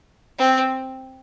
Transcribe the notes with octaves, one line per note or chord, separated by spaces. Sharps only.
C4